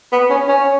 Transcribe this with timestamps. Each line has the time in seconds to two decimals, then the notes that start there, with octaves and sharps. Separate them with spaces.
0.12 B3
0.30 C#4
0.49 C#4